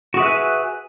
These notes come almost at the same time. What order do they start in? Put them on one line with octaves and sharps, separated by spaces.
F#4 G#4 E5 B4 G#5